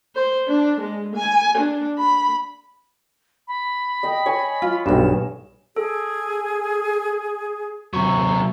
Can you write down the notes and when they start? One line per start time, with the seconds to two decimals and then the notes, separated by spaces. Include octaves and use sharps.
0.15 C5
0.47 D4
0.80 G#3
1.15 G#5
1.58 D4
1.98 B5
3.47 B5
4.03 D#5 G5
4.26 C#5 G#5
4.62 F4
4.86 B1 G2 E7
5.76 G#4 A4
7.93 C3 F#3 C#6